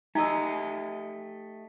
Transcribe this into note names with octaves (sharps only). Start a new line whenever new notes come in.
A3 D#4 G4 D#5 A#5 E6